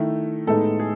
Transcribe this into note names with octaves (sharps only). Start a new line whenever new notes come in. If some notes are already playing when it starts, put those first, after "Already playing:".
Already playing: D#3 A3 E4
A2 G#3 B3 D#4 A4
G#4